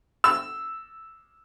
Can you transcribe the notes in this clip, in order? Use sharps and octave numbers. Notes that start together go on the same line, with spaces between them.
E6